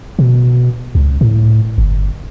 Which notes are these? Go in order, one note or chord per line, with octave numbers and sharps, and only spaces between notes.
B2
C#2
A2
G1